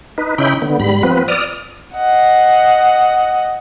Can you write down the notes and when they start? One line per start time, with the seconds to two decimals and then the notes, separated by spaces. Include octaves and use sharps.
0.18 D#4 B4
0.38 C#3 C#4 D#4 E4 G5 B5
0.62 D3 B3
0.80 G#2 G3 B5
1.03 F3 B3 C4 B4
1.28 D5 D#6 F6
1.94 D#5 F#5